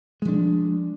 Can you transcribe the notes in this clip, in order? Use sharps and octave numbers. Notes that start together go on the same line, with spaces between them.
F3 G#3 D4